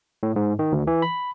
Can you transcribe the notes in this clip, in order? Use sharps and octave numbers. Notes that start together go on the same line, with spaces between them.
A2
G#2
D#3
D2
E3
B5